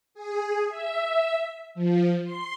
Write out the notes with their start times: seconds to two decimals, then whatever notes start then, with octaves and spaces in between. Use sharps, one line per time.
0.14 G#4
0.69 E5
1.75 F3
2.25 C6